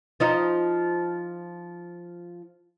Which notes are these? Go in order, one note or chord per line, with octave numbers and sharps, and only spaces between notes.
F3 D#4 F4